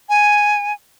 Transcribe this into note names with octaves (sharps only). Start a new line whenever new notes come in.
G#5